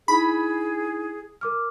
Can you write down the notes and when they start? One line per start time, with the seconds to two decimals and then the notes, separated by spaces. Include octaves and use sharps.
0.08 D#4 E4 G#4 B5
1.41 A#4 D6 F6